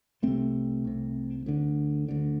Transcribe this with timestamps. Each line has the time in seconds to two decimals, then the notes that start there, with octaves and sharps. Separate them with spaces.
0.22 C2 C3 A3 C4
0.85 C2 C3
1.46 D2 D3
2.08 D2 D3